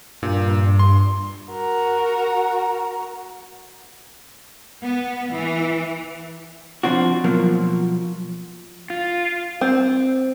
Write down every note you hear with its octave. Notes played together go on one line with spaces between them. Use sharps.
G2 A#2
C6
F#4 A#4
B3
E3
F3 C4 D4 F#4
B2 F3 F#3 A#3
F4
C4